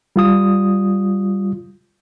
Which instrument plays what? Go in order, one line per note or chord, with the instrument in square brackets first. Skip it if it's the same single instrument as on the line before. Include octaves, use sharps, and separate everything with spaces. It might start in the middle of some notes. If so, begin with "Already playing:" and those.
[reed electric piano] G3 F4 D#6